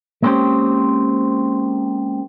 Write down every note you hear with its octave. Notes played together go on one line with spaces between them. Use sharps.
G#3 A#3 C4 C#4 G4 C5